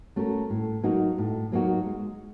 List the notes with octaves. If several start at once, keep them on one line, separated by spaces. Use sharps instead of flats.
A3 C#4 F#4 A#4
A2
F#3 A#3 D#4 F#4
A2
F#3 A#3 D#4 F#4
G#3